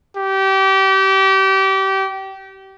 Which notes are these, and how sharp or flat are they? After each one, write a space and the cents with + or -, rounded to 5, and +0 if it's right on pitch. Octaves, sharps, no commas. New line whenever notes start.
G4 -30